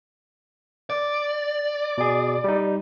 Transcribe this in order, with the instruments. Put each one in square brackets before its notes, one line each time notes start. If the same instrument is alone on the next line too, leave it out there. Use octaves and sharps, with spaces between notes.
[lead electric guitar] D5
[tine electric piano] B2 G#4
G3 D#4